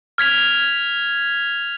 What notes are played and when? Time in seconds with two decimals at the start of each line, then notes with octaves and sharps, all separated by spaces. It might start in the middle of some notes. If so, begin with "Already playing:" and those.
0.18 F6 G#6 B6 F7